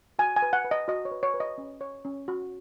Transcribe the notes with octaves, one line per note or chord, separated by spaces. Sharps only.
F#4 G#5
G#5
B4
F#5
B4
D#5
F#4 D#5
C#5
B4
C#5
B4
D#5
C#4
C#5
C#4
F#4